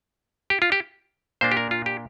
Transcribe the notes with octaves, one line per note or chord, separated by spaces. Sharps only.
G4
F4
G4
A#2 A#3 D4 C5
G4
A#4
F4
G4